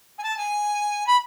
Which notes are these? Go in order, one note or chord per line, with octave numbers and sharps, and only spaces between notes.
G#5
A5
G#5
B5